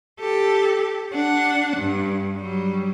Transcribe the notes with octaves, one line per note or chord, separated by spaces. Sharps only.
G4 A4
D4 F#5
G2
F#3 G3